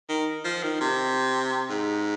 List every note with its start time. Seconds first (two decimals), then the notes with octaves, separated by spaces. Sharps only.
0.09 D#3
0.44 F3
0.63 D#3
0.81 C3
1.69 G#2